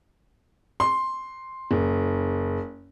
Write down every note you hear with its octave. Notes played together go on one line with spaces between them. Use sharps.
C6
F#1